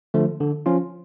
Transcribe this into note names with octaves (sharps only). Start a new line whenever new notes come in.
D3 F3 A3
D3
F3 C#4 F4